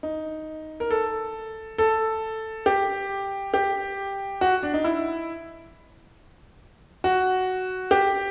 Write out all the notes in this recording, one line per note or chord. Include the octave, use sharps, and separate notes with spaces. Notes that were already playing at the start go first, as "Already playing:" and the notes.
D#4
A#4
A4
A4
G4
G4
F#4
D4
D#4
E4
F#4
G4